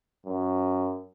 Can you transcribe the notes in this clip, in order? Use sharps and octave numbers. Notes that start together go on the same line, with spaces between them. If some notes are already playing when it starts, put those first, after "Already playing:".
F#2